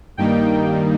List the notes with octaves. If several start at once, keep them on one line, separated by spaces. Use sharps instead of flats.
G2 D#3 G3 A#3 D#4 G5